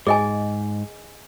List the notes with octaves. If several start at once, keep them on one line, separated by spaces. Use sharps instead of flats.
G#2 G#4 D#5 G#5